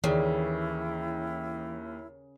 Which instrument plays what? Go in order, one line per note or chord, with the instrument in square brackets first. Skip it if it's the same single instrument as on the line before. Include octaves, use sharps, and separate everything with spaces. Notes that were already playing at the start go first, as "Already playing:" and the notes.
[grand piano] D#2 [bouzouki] C#3 [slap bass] E3 [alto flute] E4